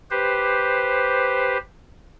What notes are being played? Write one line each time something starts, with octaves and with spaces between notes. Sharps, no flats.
G4 B4 C5